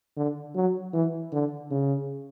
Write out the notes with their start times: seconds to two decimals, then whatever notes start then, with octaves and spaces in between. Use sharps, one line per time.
0.17 D3
0.55 F#3
0.93 E3
1.33 D3
1.71 C#3